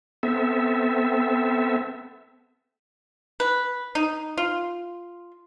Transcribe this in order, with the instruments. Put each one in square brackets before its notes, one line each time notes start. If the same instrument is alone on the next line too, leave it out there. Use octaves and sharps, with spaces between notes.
[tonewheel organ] B3 C4 A4 E5
[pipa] B4
D#4
F4